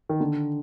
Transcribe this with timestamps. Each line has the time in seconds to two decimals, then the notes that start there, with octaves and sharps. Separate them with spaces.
0.09 D#3
0.21 D3